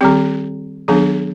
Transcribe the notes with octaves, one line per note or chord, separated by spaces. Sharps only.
D#3 G3 C4 G4
D#3 F#3 B3 D4 G#4